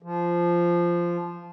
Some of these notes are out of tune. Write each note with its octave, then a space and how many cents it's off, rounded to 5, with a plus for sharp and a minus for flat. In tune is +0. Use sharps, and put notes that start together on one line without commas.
F3 -10